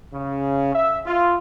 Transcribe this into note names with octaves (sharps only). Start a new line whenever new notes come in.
C#3
E5
F4